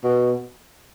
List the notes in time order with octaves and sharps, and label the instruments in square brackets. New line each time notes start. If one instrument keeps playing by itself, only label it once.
[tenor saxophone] B2